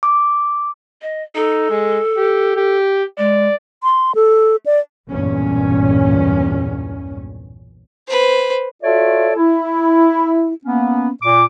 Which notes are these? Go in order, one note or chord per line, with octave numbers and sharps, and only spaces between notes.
D6
D#5
D#4 A4
G#3
G4
G4
G#3 D5
C6
A4
D5
B1 E2 G2 A#2 C#4
B4 C5
F4 F#4 A4 C#5 D5 E5
E4
A#3 B3 C#4
A#2 D6